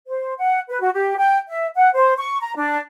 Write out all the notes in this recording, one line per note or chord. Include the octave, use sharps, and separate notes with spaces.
C5
F#5
B4
F#4
G4
G5
E5
F#5
C5
C#6
A#5
D4